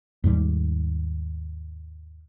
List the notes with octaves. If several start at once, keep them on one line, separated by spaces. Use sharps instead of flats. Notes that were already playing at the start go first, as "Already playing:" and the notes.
D#2 G#2 G3